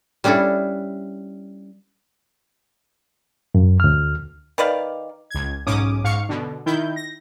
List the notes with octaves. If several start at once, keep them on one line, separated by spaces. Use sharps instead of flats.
G3 C#4 D4 E4 A4
F#2
D2 F6
D#3 B4 D5 F5
C#2 G#6
B1 G#2 C#4 D6 D#6
G#2 F5 C#6 C#7
B2 D3
D#3 E4 G6
A#6